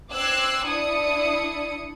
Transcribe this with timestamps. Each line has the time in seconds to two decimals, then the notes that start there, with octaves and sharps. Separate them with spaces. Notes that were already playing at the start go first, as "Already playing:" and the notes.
0.11 C4 D6 E6 F#6 G#6 C7
0.65 D4 E4 D5 D#6 C#7